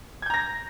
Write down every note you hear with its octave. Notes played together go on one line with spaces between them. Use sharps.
A#5 G6 G#6 A#6